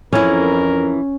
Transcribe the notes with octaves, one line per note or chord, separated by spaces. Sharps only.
F2 E3 C#4 E4 A#4